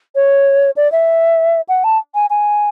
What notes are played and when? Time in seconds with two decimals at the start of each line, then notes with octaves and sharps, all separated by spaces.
0.15 C#5
0.76 D5
0.92 E5
1.69 F#5
1.84 A5
2.15 G#5
2.30 G#5